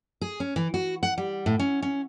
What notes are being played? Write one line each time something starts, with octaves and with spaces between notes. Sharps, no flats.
G#4
C#4
E3
F#4
F#5
G3
A2
C#4
C#4